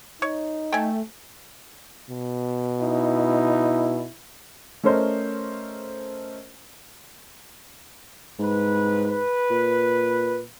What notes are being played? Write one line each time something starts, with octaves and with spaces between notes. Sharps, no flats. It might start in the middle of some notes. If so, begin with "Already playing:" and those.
D#4 C#5
A3 G5 G#5
B2
D#4 E4
A3 C#4 A4 A#4 C5 D#5
C2 G#2 B4
B4
A#2